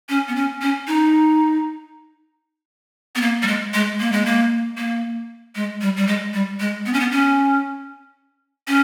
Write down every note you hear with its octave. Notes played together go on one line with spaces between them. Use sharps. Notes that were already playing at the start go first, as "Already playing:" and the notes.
C#4
B3
C#4
C#4
D#4
B3
A#3
G3
G#3
G#3
A#3
G#3
A#3
A#3
G#3
G3
G3
G#3
G3
G#3
B3
C#4
B3
C#4
C#4